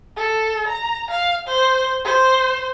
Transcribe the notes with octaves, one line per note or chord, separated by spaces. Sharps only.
A4
A#5
F5
C5
C5